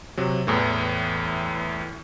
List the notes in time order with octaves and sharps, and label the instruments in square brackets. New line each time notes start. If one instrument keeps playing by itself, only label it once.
[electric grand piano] C3 F#3
E2 A2 E3